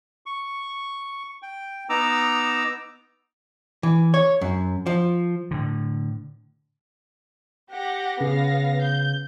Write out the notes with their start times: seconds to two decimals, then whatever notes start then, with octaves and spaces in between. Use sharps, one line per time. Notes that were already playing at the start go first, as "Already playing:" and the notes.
0.26 C#6
1.42 G5
1.89 B3 D#4 A#5 D6 E6
3.83 E3
4.14 C#5
4.41 F#2
4.86 F3
5.51 A2 D3
7.70 G4 F#5 A#6
8.21 C#3 B3 F5 A#6
8.82 G6